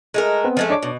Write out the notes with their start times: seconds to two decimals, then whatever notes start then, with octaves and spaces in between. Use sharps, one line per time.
0.14 G#3 A3 A#4
0.44 B3 C4 B4
0.57 F3 G#3 A3
0.70 D4 C#5 D6
0.83 B2